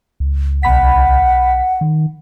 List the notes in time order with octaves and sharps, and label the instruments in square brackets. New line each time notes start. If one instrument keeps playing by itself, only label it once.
[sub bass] C#2
[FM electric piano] B1 B5 B6 [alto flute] F#5
[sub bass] D#3